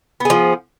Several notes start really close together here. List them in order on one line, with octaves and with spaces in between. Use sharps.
B3 G#4 F3